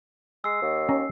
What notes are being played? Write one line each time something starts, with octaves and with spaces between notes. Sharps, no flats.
G#3 E6 C7
D#2
C#4 A#5